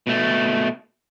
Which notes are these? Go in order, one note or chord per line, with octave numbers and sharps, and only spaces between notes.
B2 A3